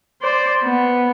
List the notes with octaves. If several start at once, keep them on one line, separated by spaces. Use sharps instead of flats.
C5 D5
B3